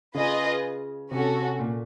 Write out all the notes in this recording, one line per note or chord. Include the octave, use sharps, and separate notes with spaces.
C#3 F4 G#4 B4 D#5
C3 C#4 F#4 A4
A#2